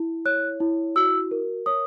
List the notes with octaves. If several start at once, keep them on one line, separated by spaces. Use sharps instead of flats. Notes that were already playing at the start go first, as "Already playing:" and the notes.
Already playing: E4
C#5 F#6
E4
F#4 E6
A#4
C#5 D#6